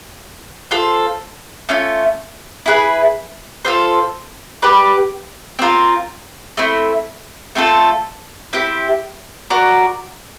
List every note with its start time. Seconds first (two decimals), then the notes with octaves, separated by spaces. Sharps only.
0.71 F4 A4 C5
1.69 A3 C#4 F4
2.66 E4 G#4 B4
3.65 F4 A4 C5
4.62 G4 B4 D5
5.59 C4 F4 A#4
6.57 A3 C4 E4
7.55 A3 C4 F4 A4
8.53 C4 E4 G4
9.50 F#4 A#4 D5